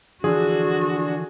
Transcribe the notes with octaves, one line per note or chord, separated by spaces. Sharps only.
D3 E3 F3 D4 F#4 G#4